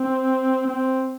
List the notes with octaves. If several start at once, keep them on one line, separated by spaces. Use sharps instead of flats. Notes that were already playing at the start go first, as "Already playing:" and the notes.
Already playing: C4
C4